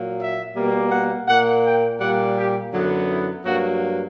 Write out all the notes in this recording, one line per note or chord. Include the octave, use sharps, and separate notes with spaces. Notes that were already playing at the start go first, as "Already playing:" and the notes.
Already playing: A#2 F#3 A#3
E5
B2 G3 A#3
F#5
A#2 A#3 F#5
G5
A#2 G3 A#3 F#5
G4
F#2 D3 F#3 B3 E4
E4
G2 F#3 A#3 F#4